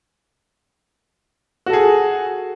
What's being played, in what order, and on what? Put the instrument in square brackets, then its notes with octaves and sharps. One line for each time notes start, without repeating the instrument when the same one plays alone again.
[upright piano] F#4
A4
G#4